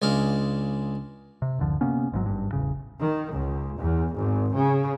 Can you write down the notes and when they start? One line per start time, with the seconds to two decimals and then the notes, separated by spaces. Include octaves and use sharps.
0.02 C#2 G#3 D4 F5
1.42 C3
1.59 D1 F#2 D3 F3
1.81 C3 A#3 B3 C#4
2.12 G#1 G#2 C3 F#3
2.26 G#1 G2
2.53 E1 A1 C#3
3.00 D#3
3.33 C#2
3.79 E2
4.15 G#1
4.55 C#3